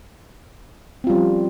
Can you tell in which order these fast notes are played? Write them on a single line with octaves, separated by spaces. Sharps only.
C4 F4 G3 C#4 F3